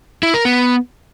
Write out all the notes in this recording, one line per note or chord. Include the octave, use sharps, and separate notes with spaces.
E4
A#4
B3